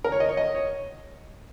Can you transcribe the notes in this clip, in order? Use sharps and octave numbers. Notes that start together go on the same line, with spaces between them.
A#4
C#5
D#5
C#5
D#5
C#5